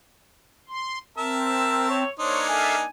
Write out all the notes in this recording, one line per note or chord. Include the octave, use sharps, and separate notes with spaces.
C6
C4 A#4 E5 A5 E6
C#5
A#3 D4 D#4 C5 C#5
A4 E5 F5 G#5